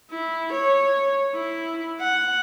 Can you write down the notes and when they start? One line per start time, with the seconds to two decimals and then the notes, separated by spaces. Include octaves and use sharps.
0.11 E4
0.53 C#5
1.35 E4
2.00 F#5